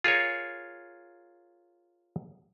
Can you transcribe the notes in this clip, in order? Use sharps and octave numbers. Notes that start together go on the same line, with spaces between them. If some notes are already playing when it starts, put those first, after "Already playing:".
F4 G#4 A#4 C#5